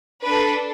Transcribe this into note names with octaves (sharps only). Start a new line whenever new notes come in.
D4 A4 B4